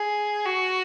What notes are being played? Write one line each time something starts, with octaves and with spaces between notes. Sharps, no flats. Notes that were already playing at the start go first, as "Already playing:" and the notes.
Already playing: G#4
F#4